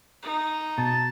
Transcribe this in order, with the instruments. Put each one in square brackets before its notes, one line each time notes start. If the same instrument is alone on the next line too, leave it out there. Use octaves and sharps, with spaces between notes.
[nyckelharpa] D#4
[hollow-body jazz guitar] B2 [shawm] A5